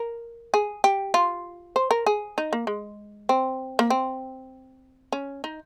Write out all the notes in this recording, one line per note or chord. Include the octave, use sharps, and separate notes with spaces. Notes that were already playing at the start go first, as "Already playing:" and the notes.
Already playing: A#4
G#4
G4
F4
C5
A#4
G#4
D#4
A#3
G#3
C4
A#3
C4
C#4
D#4